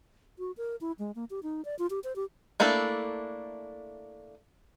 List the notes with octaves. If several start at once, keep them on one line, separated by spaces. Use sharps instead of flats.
F#4
A#4
E4
G#3
A#3
G4
D#4
D5
F4
G4
C5
G4
A3 A#3 D4 E4 A4